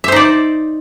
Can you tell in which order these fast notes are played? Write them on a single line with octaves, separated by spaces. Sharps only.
E5 C5 D#4 D5